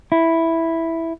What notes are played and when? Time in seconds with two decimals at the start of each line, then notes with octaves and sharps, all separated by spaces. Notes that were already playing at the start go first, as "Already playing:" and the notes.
0.12 E4